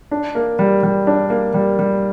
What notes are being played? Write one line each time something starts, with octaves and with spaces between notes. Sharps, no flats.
D4
A#3
G3
G3
D4
A#3
G3
G3